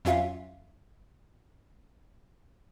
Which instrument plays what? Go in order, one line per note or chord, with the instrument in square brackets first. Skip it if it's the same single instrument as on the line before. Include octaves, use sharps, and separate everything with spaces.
[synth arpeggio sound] F2 F#3 C#4 F4 E5 F5